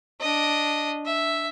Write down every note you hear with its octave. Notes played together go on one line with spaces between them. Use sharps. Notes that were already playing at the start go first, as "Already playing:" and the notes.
D4 D#5
E5